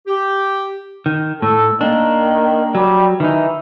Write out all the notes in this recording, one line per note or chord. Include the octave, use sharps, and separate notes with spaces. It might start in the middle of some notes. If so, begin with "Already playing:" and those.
G4
D#3
A2 A4
D#3 A#3 D4
F#3 G3
D#3 E3 D#4